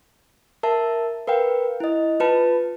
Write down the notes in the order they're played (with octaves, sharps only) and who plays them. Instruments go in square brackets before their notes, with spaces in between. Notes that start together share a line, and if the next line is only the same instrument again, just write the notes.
[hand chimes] A#4 E5 A5
A#4 B4 F5 G5
E4 D#5
F4 B4 A5